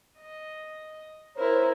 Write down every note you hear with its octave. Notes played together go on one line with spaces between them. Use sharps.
D#5
E4 A#4 C5 C#5